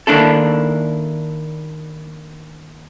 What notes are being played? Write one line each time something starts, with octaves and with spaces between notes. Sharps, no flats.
D#3 A#3 D4 E4 A4